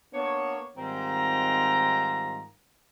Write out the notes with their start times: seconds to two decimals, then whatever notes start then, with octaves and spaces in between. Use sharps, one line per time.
0.14 A#3 B3 D4 C#5
0.76 G#2 D#3 G3 C4 F4 A#5